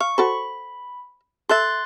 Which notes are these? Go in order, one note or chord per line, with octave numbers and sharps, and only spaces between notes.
F5 C#6
F#4 A4 C5 B5
A4 E5 C6 F#6 A6